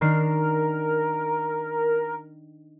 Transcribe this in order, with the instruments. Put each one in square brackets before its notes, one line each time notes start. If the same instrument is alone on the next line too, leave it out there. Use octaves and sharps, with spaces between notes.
[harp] D#3 D4 C7 [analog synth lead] A#4